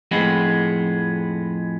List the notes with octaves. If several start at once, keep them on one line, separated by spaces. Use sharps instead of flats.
F2 A2 G#3 B3